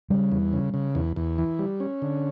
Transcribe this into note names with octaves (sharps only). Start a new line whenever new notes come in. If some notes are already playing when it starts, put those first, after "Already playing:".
C#3 G3
E2
C#3
C#3
E2
E2
E3
G3
C#4
D3